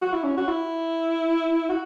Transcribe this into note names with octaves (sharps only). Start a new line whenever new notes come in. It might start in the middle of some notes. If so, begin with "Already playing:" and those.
F#4
E4
C#4
F#4
E4
F#4